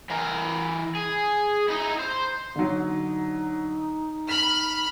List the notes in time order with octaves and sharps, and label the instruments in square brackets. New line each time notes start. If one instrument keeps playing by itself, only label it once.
[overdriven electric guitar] E3 A#4
G#4
D#4 E4
C5
[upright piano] D3 F#3 [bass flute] D#4
[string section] B5 F6 [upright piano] B6